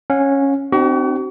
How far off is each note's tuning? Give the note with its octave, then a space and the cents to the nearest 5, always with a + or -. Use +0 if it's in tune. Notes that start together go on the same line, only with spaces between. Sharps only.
C#4 -10 F#5 -40
C4 +0 D#4 -45 F#4 +40